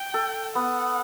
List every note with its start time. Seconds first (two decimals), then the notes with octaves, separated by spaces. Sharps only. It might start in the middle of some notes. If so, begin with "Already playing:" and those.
Already playing: G5
0.14 A4
0.55 B3 F#5